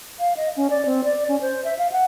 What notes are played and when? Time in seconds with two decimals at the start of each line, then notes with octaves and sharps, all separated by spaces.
0.19 F5
0.37 D#5
0.56 C#4
0.70 D5
0.86 C4
1.04 D5
1.29 C#4
1.41 C5
1.64 E5
1.78 F5
1.92 F#5